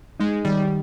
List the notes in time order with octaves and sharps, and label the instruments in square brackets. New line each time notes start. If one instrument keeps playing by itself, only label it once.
[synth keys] G#3 [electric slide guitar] D#4
[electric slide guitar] D#3 [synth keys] G3